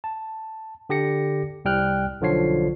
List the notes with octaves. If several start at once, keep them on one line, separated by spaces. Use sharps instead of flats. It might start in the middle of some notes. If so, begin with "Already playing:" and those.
A5
D3 G4 D6 A#6 C#7
C2 G3 G5 F6 F#6
B1 D3 F3 F4 C#5 C7